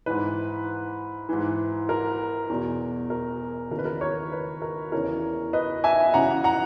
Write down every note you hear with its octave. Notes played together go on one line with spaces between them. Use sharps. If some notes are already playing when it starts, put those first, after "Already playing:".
G#2 E3 B4
G#2 E3
A#4
E2 B2
A#4
D#2 C#3 E3 A#4
B4
A#4
A#4 C#5
B4
A#4
E2 C#3 E3 A#4 C#5
B4 D#5
E5 G#5
F#2 C#3 E3 F#5 A#5
F#5 A#5